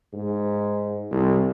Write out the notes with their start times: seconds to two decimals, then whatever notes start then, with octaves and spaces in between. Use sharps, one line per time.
0.14 G#2
1.11 C2